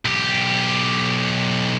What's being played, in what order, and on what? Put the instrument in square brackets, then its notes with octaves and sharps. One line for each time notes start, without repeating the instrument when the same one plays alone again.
[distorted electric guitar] B1 G4